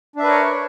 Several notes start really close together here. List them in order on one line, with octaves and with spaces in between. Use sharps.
D4 E5 B4 A#4 C#5